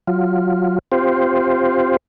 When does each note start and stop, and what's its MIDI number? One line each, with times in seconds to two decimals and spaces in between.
0.07 0.79 54
0.07 0.79 65
0.92 1.97 60
0.92 1.97 65
0.92 1.97 67
0.92 1.97 72